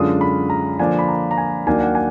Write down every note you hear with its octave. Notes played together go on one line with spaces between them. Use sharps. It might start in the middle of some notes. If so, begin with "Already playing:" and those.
Already playing: F#2 D3 G#3 D4 F4 D#6
B5
A#5
D3 F3 A#3 D4 F4 G#5
B5
A#5
A#5
G#5
D#2 D#3 F#3 A#3 D4 G#5
F#5
G#5